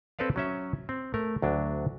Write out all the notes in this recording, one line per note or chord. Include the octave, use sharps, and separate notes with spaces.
C4 A4 B4 D5 F5
F#3 C#4 E5
C4
A3 A#4
D2 F#3 D4